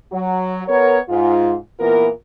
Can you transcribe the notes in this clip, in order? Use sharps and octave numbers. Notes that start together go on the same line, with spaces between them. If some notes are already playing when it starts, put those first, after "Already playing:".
F#3
B3 A#4 C#5
G#2 F4
A#2 E3 B3 F4 A#4